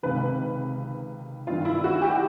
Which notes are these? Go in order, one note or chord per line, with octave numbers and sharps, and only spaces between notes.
C#2 C3 D#3 B4
G2 D#3 F4
E4
F#4
G4